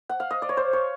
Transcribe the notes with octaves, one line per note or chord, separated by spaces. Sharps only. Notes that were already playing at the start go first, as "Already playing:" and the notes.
F#5
F5
D#5
D5
C#5
C5
C#5